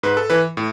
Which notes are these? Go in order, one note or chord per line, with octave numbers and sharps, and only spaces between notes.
G#2 B4
A4
E3 B4
A2